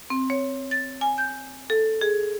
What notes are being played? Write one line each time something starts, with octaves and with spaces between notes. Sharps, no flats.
C4
C#5
A6
G#5
G6
A4
G#4